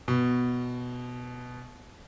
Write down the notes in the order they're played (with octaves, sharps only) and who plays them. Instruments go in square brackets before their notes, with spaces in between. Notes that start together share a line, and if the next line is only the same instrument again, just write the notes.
[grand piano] B2